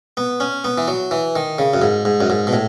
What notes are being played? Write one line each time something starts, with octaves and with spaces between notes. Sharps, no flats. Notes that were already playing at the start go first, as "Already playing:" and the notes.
B3
C#4
B3
E3
F#3
E3
D#3
C#3
F#2
G#2
G#2
F#2
G#2
B2
A2